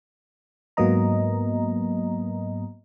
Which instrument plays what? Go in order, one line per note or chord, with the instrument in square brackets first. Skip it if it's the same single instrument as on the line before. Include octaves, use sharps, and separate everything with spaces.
[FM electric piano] G#2 F#3 A#3 B3 D#5 A#5